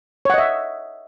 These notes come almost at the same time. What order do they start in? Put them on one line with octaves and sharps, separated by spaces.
C#5 F#5 D#5 E5